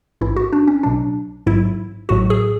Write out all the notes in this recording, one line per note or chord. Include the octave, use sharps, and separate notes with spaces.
A1 G#2 E3 E4
F#4
D4
C#4
B1 B2 F#3 D4
A1 G#2 F#3 E4
A1 A2 F#3 F#4
G#4